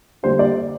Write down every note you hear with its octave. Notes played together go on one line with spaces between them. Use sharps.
D3 G3 A#3 C5
D5